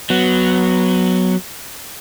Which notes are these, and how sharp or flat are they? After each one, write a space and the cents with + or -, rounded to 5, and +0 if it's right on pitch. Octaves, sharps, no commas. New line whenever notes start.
F#3 +0 B3 +0